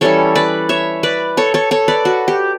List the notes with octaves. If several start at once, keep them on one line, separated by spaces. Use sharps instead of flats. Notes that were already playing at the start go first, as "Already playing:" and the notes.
E3 G3 C#4 E4 A4 C#5
B4 D5
C#5 E5
B4 D5
A4 C#5
A4 C#5
A4 C#5
B4 D5
F#4
G4